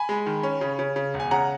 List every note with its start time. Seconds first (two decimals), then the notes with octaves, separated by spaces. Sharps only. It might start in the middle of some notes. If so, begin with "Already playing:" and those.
Already playing: G#5 B5
0.09 G#3
0.26 D#3
0.43 C#4
0.61 C#3
0.79 C#3
0.96 C#3
1.14 E1
1.20 G#5
1.31 C#3 F#5 A#5